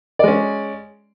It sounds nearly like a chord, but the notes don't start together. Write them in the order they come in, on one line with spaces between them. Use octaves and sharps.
D5 G#3 C#4